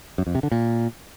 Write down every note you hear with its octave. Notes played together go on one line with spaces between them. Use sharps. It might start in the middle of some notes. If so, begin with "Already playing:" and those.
F#2
F2
C3
D3
A#2